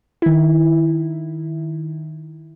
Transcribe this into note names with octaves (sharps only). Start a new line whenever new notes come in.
D#3 E4